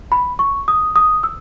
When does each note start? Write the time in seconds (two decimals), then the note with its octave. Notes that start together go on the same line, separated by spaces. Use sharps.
0.12 B5
0.39 C#6
0.68 D#6
0.96 D#6
1.23 E6